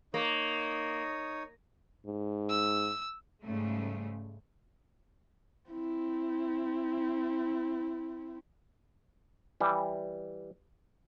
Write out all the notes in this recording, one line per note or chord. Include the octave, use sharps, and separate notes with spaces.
A#3 D#4 C#5 D#6
G#2
E6
G#2 C#3 G3 A3
C4 E4
E3 G3